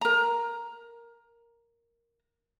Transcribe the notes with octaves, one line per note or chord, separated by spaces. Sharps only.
A#4 A#5